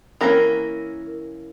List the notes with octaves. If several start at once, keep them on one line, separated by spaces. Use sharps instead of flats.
E3 A#3 C#4 A#4